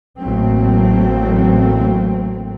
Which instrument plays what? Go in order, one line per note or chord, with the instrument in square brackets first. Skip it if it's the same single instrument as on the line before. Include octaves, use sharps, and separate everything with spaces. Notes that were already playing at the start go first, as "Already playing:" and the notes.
[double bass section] A1 A2 F#3 A3 A#3 C4